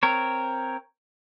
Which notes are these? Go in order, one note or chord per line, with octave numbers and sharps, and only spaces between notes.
C4 A#4 C#5